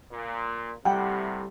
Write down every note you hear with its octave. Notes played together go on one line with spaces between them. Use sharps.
A#2
A2 C3 G3 F#5 G5